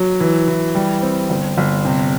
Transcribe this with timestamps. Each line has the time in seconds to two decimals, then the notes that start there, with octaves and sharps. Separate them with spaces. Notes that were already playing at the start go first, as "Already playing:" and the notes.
Already playing: F#3
0.20 E3
0.48 E3
0.75 G3
1.03 C4
1.30 G1
1.58 G1
1.85 C3